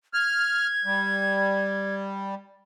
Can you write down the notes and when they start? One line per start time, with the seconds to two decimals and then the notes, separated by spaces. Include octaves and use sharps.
0.14 F6 G#6
0.85 G3